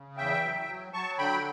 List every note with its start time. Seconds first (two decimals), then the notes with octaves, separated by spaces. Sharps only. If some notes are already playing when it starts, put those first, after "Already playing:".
Already playing: C#3
0.17 E2 E5 G5
0.43 F#3
0.68 F#3
0.93 F#3 A5 C#6
1.18 D3 G5 B5